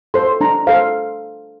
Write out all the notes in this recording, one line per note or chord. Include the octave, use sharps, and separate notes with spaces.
A4 C5 C6
D4 A#5
A4 C5 F5